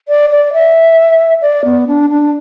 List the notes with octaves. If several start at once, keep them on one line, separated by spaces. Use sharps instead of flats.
D5
D5
E5
D5
B3
D4
D4